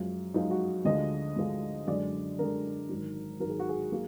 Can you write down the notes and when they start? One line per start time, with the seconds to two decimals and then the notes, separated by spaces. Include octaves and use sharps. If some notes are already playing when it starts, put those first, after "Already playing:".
Already playing: F#2 F3 G#3
0.34 F#2 F3 G#3 D#4
0.51 F#4
0.85 D2 D3 F3 G#3 D#5
1.36 D2 D3 F3 G#3
1.87 F#2 D3 G#3 D5
2.38 F#2 D3 G#3 A#4
2.89 G#1 G#2 F#3
3.40 G#1 G#2 F#3 A#4
3.50 G#4
3.59 F#4
3.69 G#4
3.92 F#3 A#3